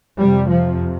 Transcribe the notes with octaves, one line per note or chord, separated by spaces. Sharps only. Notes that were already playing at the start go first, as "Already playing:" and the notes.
F2 C3 G3
F3